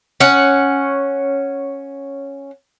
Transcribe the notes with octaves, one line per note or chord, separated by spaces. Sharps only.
C#4 F#5